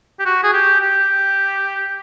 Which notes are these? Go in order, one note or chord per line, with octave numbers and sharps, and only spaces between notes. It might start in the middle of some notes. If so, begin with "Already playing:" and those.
G4
F#4
G#4
G4
G4